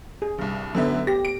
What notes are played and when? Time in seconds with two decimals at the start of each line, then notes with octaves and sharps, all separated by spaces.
0.22 G#4
0.38 C2 G2
0.75 F#2 D3 A3 B3 E5
1.07 G4 A#6
1.25 D7